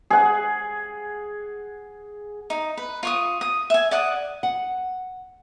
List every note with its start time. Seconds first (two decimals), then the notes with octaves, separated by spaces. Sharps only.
0.10 G#4 F#5
2.50 D#4
2.77 B4
3.03 F4 C#6 D#6
3.41 D#6
3.70 E5 G#5
3.91 D5 F#5 D#6
4.43 F#5